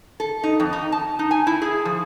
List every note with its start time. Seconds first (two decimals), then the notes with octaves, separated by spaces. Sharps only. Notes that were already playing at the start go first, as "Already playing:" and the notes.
0.20 A4
0.43 D#4
0.60 F2
0.73 D#4
0.92 A5
1.19 D#4
1.31 G#5
1.47 E4
1.62 G#4
1.85 F3